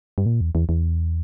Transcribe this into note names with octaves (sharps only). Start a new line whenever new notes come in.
G2
A#2
E2
E2
E2